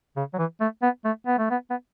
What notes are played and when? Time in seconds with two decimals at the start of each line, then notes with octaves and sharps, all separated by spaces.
0.17 C#3
0.34 F#3
0.38 E3
0.61 A3
0.82 B3
1.05 A3
1.27 B3
1.39 A3
1.50 B3
1.70 B3